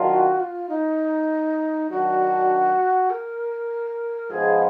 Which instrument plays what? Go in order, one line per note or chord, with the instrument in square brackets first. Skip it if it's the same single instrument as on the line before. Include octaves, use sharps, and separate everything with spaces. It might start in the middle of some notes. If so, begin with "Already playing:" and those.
Already playing: [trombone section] D#3 F#3 D4 F4
[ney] F#4
F4
D#4
[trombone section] D#3 F#3 D4 [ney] F#4
[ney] A#4
[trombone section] G#2 F3 G#3 B3 F4 [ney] G#4